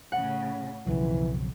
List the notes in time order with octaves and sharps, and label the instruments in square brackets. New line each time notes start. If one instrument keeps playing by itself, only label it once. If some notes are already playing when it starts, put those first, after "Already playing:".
[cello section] A2 C#3 [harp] F#5
[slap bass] B1 C#3 F#3 [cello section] F2 [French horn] E3